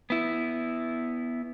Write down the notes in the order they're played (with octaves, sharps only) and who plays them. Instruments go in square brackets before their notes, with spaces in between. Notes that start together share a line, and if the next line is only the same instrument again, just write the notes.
[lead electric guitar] B3 E4